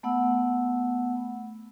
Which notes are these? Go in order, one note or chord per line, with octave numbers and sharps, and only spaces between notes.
A3 B3 F#5 E6